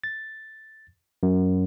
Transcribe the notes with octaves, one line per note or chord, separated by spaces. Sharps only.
A6
F#2